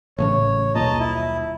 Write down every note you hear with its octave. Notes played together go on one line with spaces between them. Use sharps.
A1 A2 C#3 C#5
D#1 B1 A#2 D#5 A5 A#5
E4